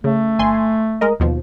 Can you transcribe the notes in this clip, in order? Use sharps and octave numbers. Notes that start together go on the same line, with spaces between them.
C#3 A3
G1 G#5 C6
G#3 A#4 D#5
D#2 B2 F3